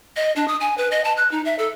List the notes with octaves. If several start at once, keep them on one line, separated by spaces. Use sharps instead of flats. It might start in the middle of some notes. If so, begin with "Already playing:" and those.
D#5
D4
D#6
G#5
B4
D#5
A5
F#6
D#4
E5
A4